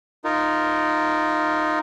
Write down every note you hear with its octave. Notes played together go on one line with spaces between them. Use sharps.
D#4 F4 A#4